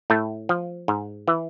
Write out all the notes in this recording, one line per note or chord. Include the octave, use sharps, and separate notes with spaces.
A2 A3
F3
G#2
E3